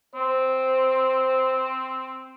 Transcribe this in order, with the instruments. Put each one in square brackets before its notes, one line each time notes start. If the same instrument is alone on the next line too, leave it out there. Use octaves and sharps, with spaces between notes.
[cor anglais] C4 [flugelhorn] C5